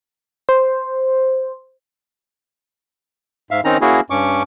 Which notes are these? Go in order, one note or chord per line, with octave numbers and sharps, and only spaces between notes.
C5
G#2 E5 F5
D#3 C4 C#4 D#4 A#5
A#3 C#4 E4 F#4 G#4
G2 C#4 C#6 D6